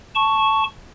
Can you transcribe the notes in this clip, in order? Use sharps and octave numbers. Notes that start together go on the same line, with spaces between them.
A5 C#6